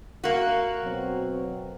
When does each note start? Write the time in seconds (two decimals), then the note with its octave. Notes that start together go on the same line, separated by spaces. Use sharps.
0.24 A#3 F#4
0.81 B2 F#3 C4